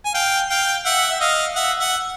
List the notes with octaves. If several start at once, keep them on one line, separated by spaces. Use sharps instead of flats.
G#5
F5 G5
F5 G5
E5 F#5
E5
D#5 F5
E5 F#5
E5 F#5